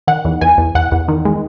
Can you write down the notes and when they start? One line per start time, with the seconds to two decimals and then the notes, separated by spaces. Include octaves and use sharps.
0.07 D#3 F#5
0.25 E2
0.41 E2 G#5
0.58 E2
0.75 E2 F#5
0.92 E2
1.08 D#3
1.25 G#3